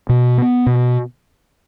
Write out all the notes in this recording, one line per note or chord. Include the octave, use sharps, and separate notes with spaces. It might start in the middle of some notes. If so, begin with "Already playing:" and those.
B2
B3
B2